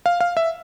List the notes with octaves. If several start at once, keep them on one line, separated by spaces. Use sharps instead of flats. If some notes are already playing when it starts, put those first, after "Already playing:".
F5
F5
E5